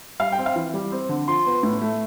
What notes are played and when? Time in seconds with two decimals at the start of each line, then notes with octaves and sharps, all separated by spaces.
0.20 G3 F5
0.32 G5
0.38 C4
0.46 F5
0.56 E3
0.74 G3
0.92 C4
1.09 D3
1.27 F3 C6
1.46 B3
1.63 A2
1.81 A3